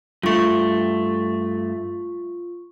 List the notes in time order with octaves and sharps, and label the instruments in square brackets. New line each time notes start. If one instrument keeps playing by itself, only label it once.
[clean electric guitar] G2 A3 [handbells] F4 C#6